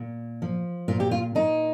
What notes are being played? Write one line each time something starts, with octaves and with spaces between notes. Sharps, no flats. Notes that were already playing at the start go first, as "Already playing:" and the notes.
Already playing: A#2
F3
A#2 F4
G4
F4
A#2 D#4